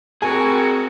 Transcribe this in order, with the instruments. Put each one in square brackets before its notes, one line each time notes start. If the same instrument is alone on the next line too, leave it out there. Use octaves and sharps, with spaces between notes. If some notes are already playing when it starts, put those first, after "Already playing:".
[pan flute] C4 [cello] F#4 [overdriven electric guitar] G#4 A#4 [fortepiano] G#5